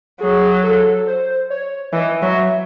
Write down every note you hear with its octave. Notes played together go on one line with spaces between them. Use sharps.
F#3 G#4
A4
C5
C#5
E3 D#5
F#3 E5